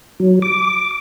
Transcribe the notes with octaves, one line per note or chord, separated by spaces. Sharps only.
F#3
D6